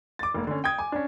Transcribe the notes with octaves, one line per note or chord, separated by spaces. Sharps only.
D6 A6
F1 A#3
D3 C#4
G5 D#6 G#6
G#5 D6
C#4 D4